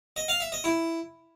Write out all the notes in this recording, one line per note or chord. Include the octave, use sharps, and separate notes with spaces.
D#5
F5
E5
D#5
E4